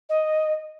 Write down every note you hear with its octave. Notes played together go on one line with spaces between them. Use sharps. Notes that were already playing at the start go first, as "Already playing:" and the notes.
D#5